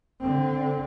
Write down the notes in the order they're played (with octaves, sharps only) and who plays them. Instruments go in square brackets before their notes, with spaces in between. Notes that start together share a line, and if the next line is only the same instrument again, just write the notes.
[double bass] D3 C4